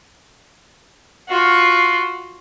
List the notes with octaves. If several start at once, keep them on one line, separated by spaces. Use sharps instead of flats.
F4 F#4